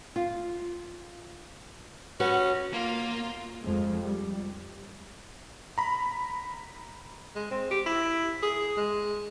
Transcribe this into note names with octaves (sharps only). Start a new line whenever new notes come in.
F4
C#4 F#4 B4
A#3 F4
F2 F3 G#3
G3
A#5 B5
G#3
C4
G4
E4
G#4
G#3